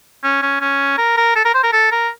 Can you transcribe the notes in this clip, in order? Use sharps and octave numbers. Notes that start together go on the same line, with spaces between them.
C#4
C#4
C#4
A#4
A#4
A4
A#4
C5
A#4
A4
A#4